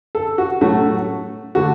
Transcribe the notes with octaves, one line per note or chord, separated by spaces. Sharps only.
A4
F#4
A2 F#3 A3 F#4
D3 A3 F#4